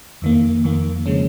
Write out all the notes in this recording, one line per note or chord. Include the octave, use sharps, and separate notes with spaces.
F2 D#3 A#3
F2 D#3 A#3
C#3 F3 G#3 C#4